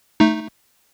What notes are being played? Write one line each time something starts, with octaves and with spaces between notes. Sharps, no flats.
A3 D#4